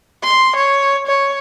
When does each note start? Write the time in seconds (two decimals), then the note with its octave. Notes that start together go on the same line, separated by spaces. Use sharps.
0.23 C6
0.56 C#5
1.07 C#5